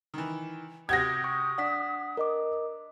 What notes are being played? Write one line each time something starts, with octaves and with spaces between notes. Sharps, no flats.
D#3 E3
C3 F#4 G4 D#6 G#6 A#6
C#6
D4 F#5 B6
A#4 D#5 D6